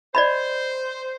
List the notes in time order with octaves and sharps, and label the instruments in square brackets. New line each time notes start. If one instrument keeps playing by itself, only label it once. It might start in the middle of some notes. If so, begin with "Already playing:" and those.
[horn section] C5 [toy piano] D5 D#5 B5